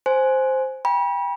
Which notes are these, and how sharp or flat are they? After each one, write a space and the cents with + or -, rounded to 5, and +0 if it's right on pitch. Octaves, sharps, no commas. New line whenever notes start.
C5 +0 G#5 +15
G5 +30 B5 -35